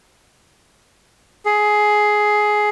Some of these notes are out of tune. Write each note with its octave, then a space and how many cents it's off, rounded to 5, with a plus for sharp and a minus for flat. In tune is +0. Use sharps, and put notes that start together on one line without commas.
G#4 +15